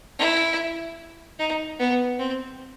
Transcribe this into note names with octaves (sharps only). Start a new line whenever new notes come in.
E4
D#4
B3
C4